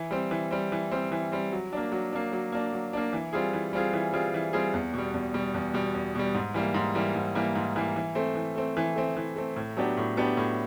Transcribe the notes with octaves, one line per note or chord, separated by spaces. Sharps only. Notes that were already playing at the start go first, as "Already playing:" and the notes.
Already playing: E3
G3 C4
E3
G3 C4
E3
G3 C4
E3
G3 C4
F#3
A#3 D4
F#3
A#3 D4
F#3
A#3 D4
F#3
A#3 D4
E3
G3 C4 F4 G#4
E3
G3 C4 F4 G#4
E3
G3 C4 F4 G#4
E3
G3 C4 F4 G#4
E2
B2 G3
E2
B2 G3
E2
B2 G3
E2
B2 G3
G#2
E3 G3 A#3
G#2
E3 G3 A#3
G#2
E3 G3 A#3
G#2
E3 G3 A#3
E3
A3 C4
E3
A3 C4
E3
A3 C4
E3
A3 C4
A2
F#3 B3 D4 G4
A2
F#3 B3 D4 G4
A2